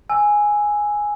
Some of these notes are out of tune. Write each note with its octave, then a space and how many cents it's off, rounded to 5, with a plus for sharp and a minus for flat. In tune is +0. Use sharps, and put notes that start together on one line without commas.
G#5 +0 E6 +0